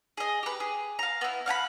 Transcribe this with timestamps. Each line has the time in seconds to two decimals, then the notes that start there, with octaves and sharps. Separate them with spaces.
0.17 G#4 D#5
0.43 G4 B4
0.60 G#4
0.99 F5 A#5
1.21 B3 E4
1.46 F5 F#5 G#5 B5